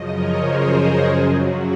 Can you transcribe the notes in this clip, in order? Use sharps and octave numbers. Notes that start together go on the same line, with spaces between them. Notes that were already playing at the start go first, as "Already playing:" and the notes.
Already playing: F#2 C#3 F3 D#5
A#4 C#5
G#4 C5
F#2 C#3 F#3 F4 G#4
F#4